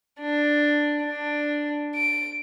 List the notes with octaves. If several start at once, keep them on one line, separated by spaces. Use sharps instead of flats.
D4
D4
D7